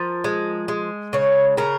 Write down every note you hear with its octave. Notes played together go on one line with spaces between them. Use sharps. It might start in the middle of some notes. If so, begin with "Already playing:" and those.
Already playing: F3 A#4
G#3
G#3
C#3 C#5
C#3 A#4